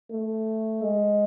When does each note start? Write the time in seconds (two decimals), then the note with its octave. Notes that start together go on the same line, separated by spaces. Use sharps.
0.11 A3
0.83 G#3